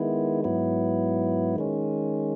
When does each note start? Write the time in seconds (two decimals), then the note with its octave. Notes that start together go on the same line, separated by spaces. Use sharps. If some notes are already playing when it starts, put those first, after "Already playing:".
Already playing: D#3 G#3 B3 E4
0.44 G#2 F#3 B3 E4
1.56 D#3 G#3 C#4